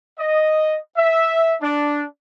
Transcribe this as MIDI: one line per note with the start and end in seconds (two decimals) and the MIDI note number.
0.19 0.78 75
0.96 1.55 76
1.61 2.04 62